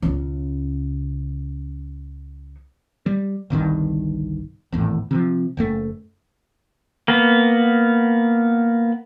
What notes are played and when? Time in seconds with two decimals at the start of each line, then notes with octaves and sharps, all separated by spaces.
0.02 C#2 C#3
3.06 G3
3.50 G1 C2 G2 D#3
4.72 G#1 E2 A2
5.11 C3 E3 F3
5.57 F#1 F#2 A3
7.08 A#3 B3